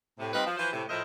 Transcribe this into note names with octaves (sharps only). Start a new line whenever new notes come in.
A2 C3
G3 C4 D#4 F4 B4
F3
E3 F3 F4 B4 C5
A2 C3
A2 F3 A#4 C5 D#5 E5